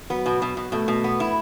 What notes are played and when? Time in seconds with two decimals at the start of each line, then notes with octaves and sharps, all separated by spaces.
0.10 F#3 B3
0.26 B2
0.42 B2
0.57 B2
0.72 B2 A3
0.88 B2
1.04 B3
1.20 E4